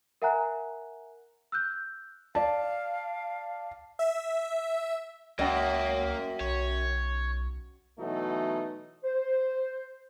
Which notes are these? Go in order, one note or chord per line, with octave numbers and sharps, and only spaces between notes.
A#4 E5 F#5 G#5 A#5 F#6
E6 F#6 G6
D5 F5 A5
E5
C#2 F#2 A#3 D#5 F#5 G5
B1 C#5
B2 E3 F#3 A3 D#4
C5